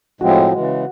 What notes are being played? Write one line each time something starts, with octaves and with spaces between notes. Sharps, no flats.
A2 F3 G#3 C4 F#4
C#3 E3 G#3